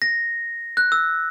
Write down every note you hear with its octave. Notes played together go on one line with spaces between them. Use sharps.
A#6
F#6
E6